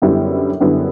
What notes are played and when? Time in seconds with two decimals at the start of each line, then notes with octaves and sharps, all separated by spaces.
0.02 F#2 D3 G3 B3 E4
0.60 F#2 D3 G3 B3 E4